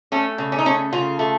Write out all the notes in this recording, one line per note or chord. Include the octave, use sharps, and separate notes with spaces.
A3 C#4
C#3
C#4
D#4
A3 C#4
C#3 F4
A3